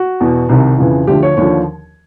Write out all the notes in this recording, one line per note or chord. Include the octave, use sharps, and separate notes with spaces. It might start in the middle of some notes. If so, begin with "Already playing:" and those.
Already playing: F#4
E2 B2
C2 C3 D#3
F2 C#3 E3
D2 D3 F3 G4
C#5
D#2 D3 F3 C#5